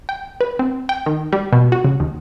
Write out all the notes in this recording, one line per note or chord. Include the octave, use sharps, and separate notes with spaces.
G5
B4
C4
G5
D#3
G3
B2
F#4
C#3
D#2